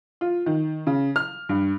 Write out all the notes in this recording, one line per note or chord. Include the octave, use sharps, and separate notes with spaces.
F4
D#3
C#3
F6
G2